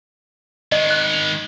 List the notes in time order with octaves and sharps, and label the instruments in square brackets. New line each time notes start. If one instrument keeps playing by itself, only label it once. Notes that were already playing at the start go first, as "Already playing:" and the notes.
[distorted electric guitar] D#3 G#3 [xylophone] D#5
[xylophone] F#6
F7